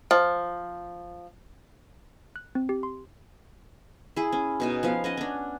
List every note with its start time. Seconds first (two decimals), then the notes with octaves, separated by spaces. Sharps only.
0.11 F3
2.36 F#6
2.55 C4
2.69 G4
2.83 C6
4.16 E4 G#4
4.32 C#4
4.60 B2 D#4 G#5
4.83 F3 B3 F5
5.04 C#4 D#5 F#5
5.17 C#4 D4